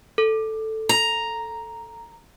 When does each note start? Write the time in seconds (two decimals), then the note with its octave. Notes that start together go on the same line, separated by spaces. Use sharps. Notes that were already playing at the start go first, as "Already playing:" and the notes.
0.18 A4
0.89 A#5